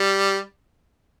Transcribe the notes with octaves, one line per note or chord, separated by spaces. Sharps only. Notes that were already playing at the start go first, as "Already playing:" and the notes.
Already playing: G3